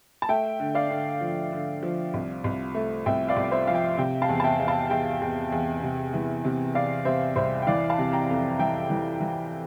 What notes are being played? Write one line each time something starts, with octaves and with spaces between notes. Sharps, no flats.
A5
A3 E5 G5
D3
D5 F5
D3
F3
D3
F3
C2
C2
A3
C2 E5 G5
D5 F5
C2
D5
C5 E5
F3 F5
E5 G5
C3 E5 G5
F5 A5
E2
A5
E5 G5
E2
F5 A5
E2 E5 G5
E2
E2
C3
E3
C3
C3 D5 F5
C3 C5 E5
C2 C5 E5
G5
E3 D5 F5
F5 A5
C3
G5 A#5
F2
E3 E5 G5
E3
E3